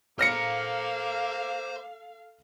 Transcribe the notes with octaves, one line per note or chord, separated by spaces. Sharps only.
A#3 A4 C5 F5 A#5 F6 A#6 C#7